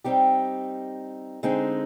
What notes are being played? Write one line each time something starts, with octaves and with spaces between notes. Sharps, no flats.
G3 C4 D#4 G4
D3 G#3 C4 D#4 G#4